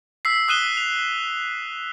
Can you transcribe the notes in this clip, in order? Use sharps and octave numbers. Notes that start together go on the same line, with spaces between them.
E6 B6 C7
D#6 E6 F#6 D#7 E7 G7
F7